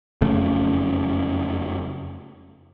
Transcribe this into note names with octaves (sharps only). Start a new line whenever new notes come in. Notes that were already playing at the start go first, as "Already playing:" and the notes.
F#1 F2 C#3 A3